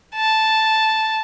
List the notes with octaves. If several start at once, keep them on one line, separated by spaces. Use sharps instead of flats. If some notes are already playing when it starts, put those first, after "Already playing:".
A5